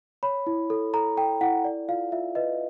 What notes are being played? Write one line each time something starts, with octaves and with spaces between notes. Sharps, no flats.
C#5 B5
E4
A4
A4 A#5
A4 G5
E4 F#5
D5
F4 F5
F4 E5
B4 D#5